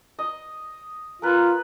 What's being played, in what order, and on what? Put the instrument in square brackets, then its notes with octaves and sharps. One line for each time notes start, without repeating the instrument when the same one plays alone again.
[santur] D#5
[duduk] F4 [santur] A#4 B4